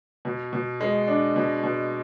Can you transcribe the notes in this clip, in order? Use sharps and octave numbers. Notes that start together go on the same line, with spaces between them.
B2
B2
G#3
D4
B2
B2